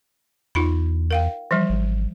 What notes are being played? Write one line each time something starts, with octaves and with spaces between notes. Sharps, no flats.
E2 D#4 F4 B5
A#4 F5 G5
E3 F3 G3
G#1